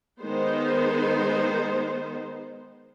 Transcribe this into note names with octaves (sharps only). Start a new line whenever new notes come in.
D#3 G#3 B3 D#4 C5